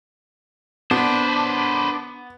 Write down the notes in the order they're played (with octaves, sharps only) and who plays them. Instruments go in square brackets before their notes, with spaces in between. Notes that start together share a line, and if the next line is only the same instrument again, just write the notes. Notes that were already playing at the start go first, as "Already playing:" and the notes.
[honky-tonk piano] B3 [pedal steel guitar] D4 [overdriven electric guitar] B4 C5